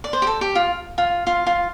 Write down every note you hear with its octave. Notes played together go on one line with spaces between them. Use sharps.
D5
C5
G4
A4
G4
F4
F4
F4
F4